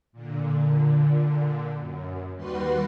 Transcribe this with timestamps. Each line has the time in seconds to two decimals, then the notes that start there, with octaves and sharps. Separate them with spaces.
0.12 A#2 D3
1.78 F#2
2.35 D#2 G3 F#4 B4 C6